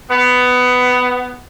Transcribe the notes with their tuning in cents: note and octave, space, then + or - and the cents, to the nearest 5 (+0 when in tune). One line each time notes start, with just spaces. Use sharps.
B3 +15